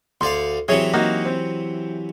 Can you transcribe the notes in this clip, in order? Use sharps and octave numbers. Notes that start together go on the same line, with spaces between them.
D2 D5 F5 C6
C3 E3 F#3 G#4 C#5 E5
A#3 D#4 F#4
C4